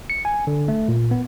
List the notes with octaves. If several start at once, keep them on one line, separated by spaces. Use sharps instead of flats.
C#7
G#5
D3
A3
A#2
B3